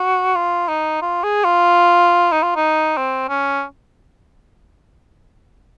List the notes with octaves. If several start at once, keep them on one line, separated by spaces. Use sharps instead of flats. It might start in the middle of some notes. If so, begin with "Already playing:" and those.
Already playing: F#4
F4
D#4
F4
G#4
F4
D#4
F4
D#4
C4
C#4